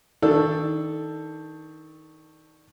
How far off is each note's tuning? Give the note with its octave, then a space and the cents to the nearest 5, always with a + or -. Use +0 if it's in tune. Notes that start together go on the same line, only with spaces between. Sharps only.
D#3 +25 D4 +10 A4 +0